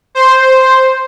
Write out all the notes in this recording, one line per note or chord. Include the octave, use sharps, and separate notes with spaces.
C5